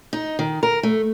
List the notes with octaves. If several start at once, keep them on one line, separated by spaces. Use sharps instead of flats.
D#4
D#3
A#4
A3